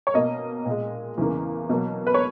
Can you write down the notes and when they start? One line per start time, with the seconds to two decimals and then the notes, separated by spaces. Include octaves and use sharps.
0.07 C#5
0.14 B2 A#3 D#5
0.65 A#2
0.71 G#3
1.18 E2 C#3 E3 A#3
1.69 B2 F#3 A#3
2.07 B4
2.14 C#5